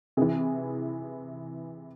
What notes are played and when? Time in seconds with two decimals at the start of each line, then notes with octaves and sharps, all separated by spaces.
0.17 C3 E3 G#4